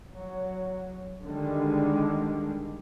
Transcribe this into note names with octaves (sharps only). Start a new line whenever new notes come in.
F#3
D3 D#3 G3 G#3